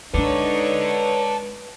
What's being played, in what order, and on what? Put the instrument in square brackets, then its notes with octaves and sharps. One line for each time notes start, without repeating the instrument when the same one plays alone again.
[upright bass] G#3 D4 [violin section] D#4 C#5 [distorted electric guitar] A4 D5 [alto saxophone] B4